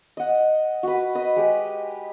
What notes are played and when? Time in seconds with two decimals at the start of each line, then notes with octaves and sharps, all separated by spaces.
0.17 D#5 F#5
0.83 F#4 B4
1.15 B4 D#5
1.36 G#3 G4